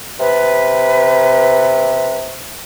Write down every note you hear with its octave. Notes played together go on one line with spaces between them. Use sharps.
C3 B4